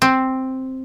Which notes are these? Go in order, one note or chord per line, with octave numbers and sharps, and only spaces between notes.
C4